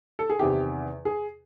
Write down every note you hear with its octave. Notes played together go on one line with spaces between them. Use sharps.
A4
G#4
E2 C3 D#3 G4
G#4